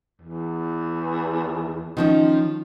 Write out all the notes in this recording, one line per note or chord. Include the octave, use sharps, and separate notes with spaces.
E2
D#3 F3 C#4